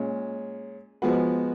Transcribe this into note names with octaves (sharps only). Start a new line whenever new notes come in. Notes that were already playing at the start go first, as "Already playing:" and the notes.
Already playing: A#2 G#3 C#4
F3 G#3 B3 F#4 B4